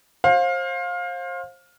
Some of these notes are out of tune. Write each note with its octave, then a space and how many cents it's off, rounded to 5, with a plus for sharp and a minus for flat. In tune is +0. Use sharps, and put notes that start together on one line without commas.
C5 +30 F5 +20